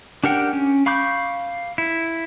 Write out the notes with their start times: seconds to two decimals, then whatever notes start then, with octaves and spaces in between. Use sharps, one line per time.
0.24 D4 G4 A#4 F#5 G5
0.53 C#4
0.86 F5 B5 C#6 D6 G6
1.78 E4